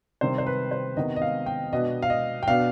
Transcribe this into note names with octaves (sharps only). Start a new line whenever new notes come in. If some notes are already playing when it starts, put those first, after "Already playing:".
C3 D#3 G3 C5
C5
B4
C5
C3 D#3 B3 D#5
D#5
F5
G5
B2 B3 D4 D#5
F5
D#5
G5
B2 B3 D4 F5